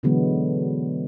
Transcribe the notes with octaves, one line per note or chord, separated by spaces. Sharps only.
B2 D3 E3 F#3 G#3 B3